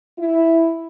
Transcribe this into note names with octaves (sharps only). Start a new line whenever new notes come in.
E4